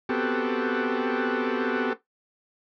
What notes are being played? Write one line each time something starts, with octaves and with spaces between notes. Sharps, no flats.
B3 C4 F#4 G4 A4